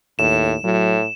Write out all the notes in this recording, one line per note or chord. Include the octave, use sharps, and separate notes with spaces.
D#2 A2 E7
A2 F#3